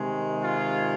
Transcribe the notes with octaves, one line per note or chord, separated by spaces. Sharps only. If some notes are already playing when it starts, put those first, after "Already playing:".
Already playing: C3 D#3 G#3
F4